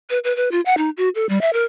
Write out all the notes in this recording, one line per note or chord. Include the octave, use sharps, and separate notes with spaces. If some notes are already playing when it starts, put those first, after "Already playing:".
B4
B4
B4
F4
F#5
D#4
F#4
A4
G3
E5
A#4